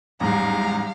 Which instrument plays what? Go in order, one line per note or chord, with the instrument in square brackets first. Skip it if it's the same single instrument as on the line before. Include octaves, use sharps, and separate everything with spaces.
[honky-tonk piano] A1 E2 G#2 [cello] F#3 G3 [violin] F5 A#5